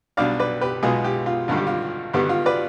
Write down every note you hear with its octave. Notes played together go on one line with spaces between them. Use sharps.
B1 B2 G3 D4 D5 F5
B4 D5
G4 B4
B1 B2 G#3 B3 F4 G#4
G4
F4
G#1 G2 D3 G3 F4
G4
F4
G#1 G2 D3 G3 B3 G4
F4
B4 D5